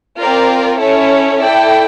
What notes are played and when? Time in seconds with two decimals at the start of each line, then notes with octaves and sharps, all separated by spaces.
0.18 C4 F4 A#4 D5
0.79 C#4 E4 A4 C#5
1.40 E4 A4 D5 G5